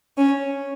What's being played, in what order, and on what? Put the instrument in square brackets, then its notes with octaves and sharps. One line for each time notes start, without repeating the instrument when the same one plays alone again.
[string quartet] C#4